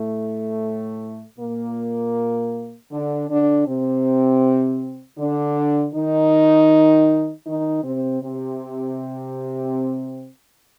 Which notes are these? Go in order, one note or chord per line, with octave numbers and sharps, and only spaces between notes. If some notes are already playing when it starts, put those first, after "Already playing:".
Already playing: A2 A3
A#2 A#3
D3 D4
D3 D4
C3 C4
D3 D4
D#3 D#4
D#3 D#4
C3 C4
C3 C4